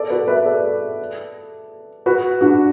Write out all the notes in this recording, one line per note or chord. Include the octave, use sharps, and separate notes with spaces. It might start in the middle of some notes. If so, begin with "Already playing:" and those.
Already playing: A4 D5
F#4 B4
B4 E5
A4 D5
F#4 B4
D4 F#4